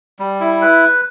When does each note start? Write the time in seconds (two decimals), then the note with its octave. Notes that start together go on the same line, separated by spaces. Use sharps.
0.20 G3
0.40 E4
0.62 B4